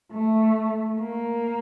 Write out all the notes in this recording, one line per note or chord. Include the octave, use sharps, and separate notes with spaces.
A3
A#3